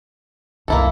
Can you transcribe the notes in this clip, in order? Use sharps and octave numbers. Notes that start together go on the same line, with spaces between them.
C2 F#2 A#3 E4 A4